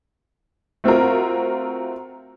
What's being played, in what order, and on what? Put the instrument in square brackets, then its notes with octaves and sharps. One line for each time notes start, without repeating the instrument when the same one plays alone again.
[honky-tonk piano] A3 C4 F4 F#4 A#4